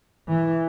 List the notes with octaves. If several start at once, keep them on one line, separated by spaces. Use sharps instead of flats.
E3